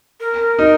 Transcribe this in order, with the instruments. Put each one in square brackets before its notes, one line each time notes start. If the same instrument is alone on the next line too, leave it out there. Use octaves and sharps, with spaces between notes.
[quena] A#4
[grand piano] D#4